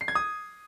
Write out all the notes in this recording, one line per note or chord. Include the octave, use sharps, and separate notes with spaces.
C7
G#6
D#6